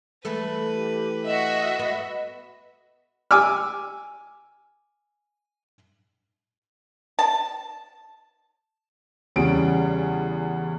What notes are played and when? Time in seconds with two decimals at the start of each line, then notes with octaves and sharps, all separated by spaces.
0.25 E3 A3 A4 B4
0.75 G4
1.25 F#4 D#5 E5
1.79 B3
3.31 G#5 D6 E6 F6
7.19 A5
9.36 E2 C#3 G3 D7